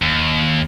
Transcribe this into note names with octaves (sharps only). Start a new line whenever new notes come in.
D#2